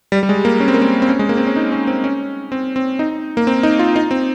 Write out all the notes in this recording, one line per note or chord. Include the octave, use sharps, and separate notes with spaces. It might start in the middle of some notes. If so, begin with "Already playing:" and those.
G3
G3
G#3
A#3
C#4
C4
A#3
C4
C4
C#4
G#3
A#3
C4
C#4
D#4
C#4
C4
C#4
C4
C4
D#4
A#3
C4
D#4
F4
D#4
C4